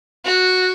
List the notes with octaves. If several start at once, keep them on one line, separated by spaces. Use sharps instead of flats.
F#4